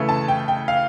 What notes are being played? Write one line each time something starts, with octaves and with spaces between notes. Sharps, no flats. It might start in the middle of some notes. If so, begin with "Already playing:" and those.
Already playing: C#3 E3 A3
A5
G5
G5
F5